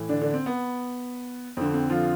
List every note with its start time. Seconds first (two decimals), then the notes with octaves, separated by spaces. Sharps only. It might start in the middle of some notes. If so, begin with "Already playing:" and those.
Already playing: A2 E3
0.09 D3 D4
0.21 D3 D4
0.34 C4
0.46 B3
1.57 F2 D3 C4
1.74 C4
1.90 F3 F4